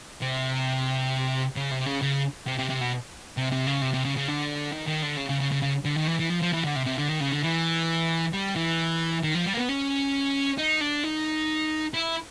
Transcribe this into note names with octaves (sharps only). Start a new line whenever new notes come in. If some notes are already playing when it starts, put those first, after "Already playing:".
C3
C#3
C3
C#3
C#3
C3
C3
C3
B2
C3
C3
C#3
C3
C3
C#3
C#3
D3
D#3
D#3
D3
C#3
C#3
C#3
C#3
C#3
D3
D#3
E3
E3
F3
F3
E3
D3
C3
C3
D3
D#3
C#3
D3
E3
G3
E3
D#3
F3
G3
A#3
B3
C#4
D#4
D4
D#4
E4